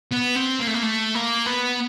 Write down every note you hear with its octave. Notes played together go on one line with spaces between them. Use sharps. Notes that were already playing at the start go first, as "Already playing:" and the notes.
B3
C4
A#3
A3
A#3
A3
A#3
B3